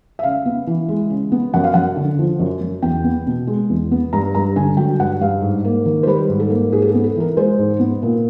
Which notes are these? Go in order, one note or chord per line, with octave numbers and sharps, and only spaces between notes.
E5
C#3 F5
B3
E3
G#3
C#3
B3
F#2 F#5
F5
F#2 F#5
D3
F3
F#2
F#2
E2 G5
B3
B2
G#3
E2
B3
G2 A#5
G2 A#5
D3 G#5
F#3 G5
G2 F#5
G2 F5
G#2
A#3
D#3
C5
G3 B4
G#2
A4
A#3
G#2 G#4
G#4
A4
B3
A4
E3 A#4
G#3 C5
G#2
B3
A#2